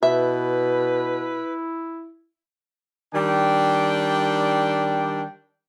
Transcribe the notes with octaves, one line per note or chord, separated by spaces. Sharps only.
B2 E4 B4 E5
D#3 G3 D4 G5